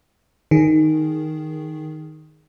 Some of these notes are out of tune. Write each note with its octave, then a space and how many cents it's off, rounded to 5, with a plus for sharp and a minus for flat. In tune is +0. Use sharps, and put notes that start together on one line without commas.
D#3 +0 G#4 +0